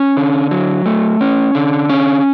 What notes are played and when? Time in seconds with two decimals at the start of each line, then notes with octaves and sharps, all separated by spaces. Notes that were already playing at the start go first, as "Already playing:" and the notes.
Already playing: C#4
0.17 D3
0.51 F#3
0.86 A3
1.21 C#4
1.55 D3
1.90 C#4